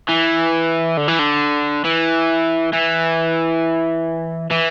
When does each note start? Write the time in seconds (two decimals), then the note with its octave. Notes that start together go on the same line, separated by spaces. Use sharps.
0.09 E3
0.97 D3
1.08 E3
1.19 D3
1.85 E3
2.73 E3
4.51 E3